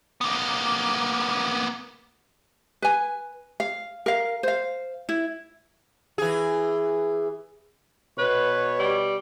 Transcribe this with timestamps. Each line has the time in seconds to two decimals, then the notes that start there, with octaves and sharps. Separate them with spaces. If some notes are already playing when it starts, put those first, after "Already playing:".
0.21 A#3 B3
2.82 B4 G#5
3.60 F5
4.06 A#4 F5
4.43 C5 F5
5.09 E4
6.18 E3 G#4
8.18 B2 B4 C#5
8.79 G3